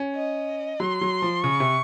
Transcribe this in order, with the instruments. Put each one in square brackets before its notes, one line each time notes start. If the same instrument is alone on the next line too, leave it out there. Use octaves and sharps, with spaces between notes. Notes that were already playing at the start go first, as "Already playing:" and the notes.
Already playing: [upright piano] C#4
[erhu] D#5
[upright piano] F#3 [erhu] C6
[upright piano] F#3
F3
[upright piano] C#3 [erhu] C#6
[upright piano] C3